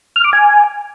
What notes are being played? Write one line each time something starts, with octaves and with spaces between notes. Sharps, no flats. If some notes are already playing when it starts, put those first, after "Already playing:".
F6
D6
G#5